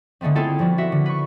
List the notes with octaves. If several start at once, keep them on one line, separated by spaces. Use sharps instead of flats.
D3 G#3 A3 B3 C4
C4 E4 F4 G#4 A4 G5
F3 G3 C4 F#4
F#4 E5
D3
B4 C#6